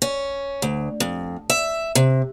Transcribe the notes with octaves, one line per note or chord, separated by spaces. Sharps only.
C#4
D2
F2
E5
C3